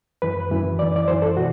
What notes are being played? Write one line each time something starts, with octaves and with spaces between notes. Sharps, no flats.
F#2 E3 B4
F#2 E3
F#2 E3 D5
D5
F#2 E3 C5
A4
B2 F#4